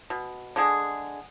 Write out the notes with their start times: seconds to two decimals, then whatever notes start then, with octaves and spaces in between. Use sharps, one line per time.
0.10 B2
0.56 D3 G#3 G#4